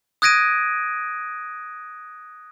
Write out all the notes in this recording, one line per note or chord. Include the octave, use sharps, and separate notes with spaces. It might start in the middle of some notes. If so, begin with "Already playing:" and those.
D#6 F#6 G#6 A#6 D7 D#7